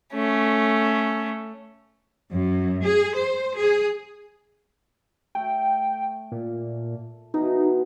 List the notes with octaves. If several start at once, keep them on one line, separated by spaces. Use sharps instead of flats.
A3 C#4
F#2
G#4
C5
G#4
A3 A4 G5
A#2
B2 E3 D#4